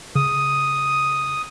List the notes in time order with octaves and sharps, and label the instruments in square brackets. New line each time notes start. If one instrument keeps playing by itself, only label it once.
[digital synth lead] C#3 [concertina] D#6